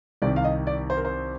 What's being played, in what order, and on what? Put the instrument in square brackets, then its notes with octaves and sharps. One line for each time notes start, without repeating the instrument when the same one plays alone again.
[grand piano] C2 C3 D#3 G3 D5
F5
D#5
D5
C5
A#4
C5